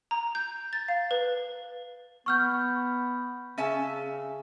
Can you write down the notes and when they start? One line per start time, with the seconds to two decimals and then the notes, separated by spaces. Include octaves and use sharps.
0.11 A#5
0.35 G6
0.73 A6
0.88 F5
1.11 B4
2.26 B3 C#6 F6 G6
3.58 C#3 C#4 E5 A5